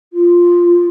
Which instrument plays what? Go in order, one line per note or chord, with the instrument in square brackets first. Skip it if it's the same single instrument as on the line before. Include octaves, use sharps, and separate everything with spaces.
[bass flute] F4